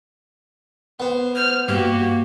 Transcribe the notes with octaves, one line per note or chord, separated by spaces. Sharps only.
B3 C5
C5 F6
G2 A#3 F#4 G4